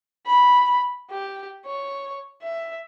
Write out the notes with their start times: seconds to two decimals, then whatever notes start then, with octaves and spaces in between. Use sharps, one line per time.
0.26 B5
1.10 G4
1.66 C#5
2.42 E5